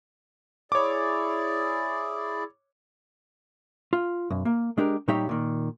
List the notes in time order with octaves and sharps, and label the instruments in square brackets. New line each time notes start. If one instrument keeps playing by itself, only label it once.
[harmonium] E4 G#4 D5 [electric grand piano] C#5 D6
[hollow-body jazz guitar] F4
B1 F#2
A#3
G#3 D4 G4 A#4
A#2 G3 D#4 G4 C#5 E5
A#2 D#3